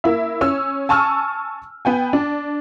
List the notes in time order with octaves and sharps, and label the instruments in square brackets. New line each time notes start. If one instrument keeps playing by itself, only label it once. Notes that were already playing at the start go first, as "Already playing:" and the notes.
[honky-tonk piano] A#3 E4 E5
C#4 E6
G#5 A5 C#6 E6 F6
B3 G5 G#5
D4